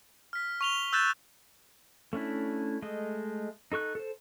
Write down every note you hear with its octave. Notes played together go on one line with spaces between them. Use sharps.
F6 B6
C#6 F7 G7
E6 F#6 G6 A6 E7
A3 C#4 D4 E4
G#3 A3 D#5
D#4 A4 C#6 F#6
A4 C5